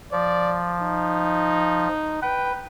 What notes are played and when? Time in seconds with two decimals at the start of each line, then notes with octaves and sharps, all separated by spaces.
0.12 F3 D5
0.81 D#4
2.22 B4 G5